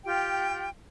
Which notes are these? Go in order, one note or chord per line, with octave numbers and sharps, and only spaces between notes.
F4 G4 G5